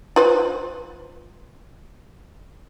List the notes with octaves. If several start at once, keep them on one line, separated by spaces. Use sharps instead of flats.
F4 B4 C5